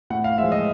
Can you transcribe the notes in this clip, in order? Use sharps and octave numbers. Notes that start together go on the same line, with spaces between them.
A2 F#5
F5
F3 G#3 E5
D#5